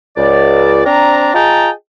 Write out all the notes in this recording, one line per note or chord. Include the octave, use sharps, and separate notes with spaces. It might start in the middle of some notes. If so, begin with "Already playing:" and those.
C#2 D5
C4 D4 A#5
F4 G#4 D#5 G5 A5 A#5